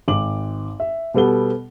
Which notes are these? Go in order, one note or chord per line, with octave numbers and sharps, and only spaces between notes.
G#1 D6 F#7
E5
B2 G3 B3 A4 G7